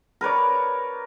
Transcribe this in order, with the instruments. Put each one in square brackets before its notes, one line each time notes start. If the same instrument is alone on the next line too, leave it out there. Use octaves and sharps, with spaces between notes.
[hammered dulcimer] A#4 B4 C#5 D5